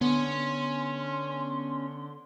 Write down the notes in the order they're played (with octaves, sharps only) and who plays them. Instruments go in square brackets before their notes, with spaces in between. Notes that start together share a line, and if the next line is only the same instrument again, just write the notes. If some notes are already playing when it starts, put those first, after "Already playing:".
[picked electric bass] D3 [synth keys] B3 [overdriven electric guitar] C#4 [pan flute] C6